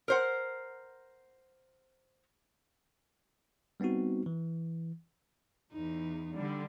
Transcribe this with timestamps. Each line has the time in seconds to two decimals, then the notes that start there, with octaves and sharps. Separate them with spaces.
0.08 A#4 C5 F#5
3.80 G3 B3 C4 D#4 F#4
4.26 E3
5.73 E2 D#4
6.35 D3 G3